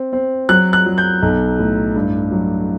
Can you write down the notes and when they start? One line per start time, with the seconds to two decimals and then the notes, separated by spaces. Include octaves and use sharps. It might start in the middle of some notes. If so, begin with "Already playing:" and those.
Already playing: C4
0.13 C4
0.49 F#3 F#6
0.73 F#6
0.86 F#3
0.98 G6
1.22 B1
1.59 A2
1.96 G2
2.31 F#3